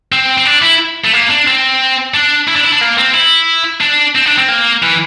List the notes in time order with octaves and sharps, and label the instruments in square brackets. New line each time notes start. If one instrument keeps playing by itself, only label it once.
[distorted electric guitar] C4
C4
D4
E4
A3
A#3
D4
C4
D4
E4
D4
E4
D4
A#3
C4
E4
D4
C4
D4
C4
A#3
E3